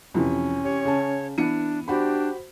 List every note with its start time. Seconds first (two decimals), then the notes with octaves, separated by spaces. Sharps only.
0.14 F2 C3 E3 C#4
0.64 G4 C#5
0.85 C#3 A5
1.38 E3 B3 D4 E4 C#7 D#7
1.88 D4 F#4 G4 C5 B5